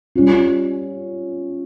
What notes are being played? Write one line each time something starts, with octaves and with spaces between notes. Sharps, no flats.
G3 C#4 F4